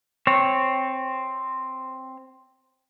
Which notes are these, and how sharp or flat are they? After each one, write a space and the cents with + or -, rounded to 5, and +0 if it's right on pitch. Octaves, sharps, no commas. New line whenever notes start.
C4 +0 C#5 -15